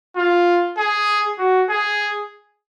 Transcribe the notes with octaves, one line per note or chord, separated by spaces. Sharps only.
F4
G#4
F#4
G#4